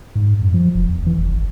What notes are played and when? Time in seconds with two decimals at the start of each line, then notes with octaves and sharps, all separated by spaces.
0.15 G#2
0.42 F#2
0.54 F3
0.75 F1
0.89 E2
1.06 E3
1.18 F#1
1.32 G#1